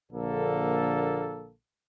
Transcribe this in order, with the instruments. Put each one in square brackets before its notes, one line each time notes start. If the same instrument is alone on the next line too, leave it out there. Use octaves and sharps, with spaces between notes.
[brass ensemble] A#1 D3 A#3 A4